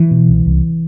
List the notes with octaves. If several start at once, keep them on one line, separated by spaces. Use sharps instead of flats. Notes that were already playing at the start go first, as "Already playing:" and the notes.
Already playing: E3
B2
C2
C2